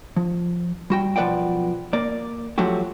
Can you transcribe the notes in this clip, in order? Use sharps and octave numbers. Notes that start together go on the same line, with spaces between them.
F3
G3 F#4 G5
B1 F3 B4 D5 F#5 G5
A#3 D5
F3 F#3 A3 F#4 G4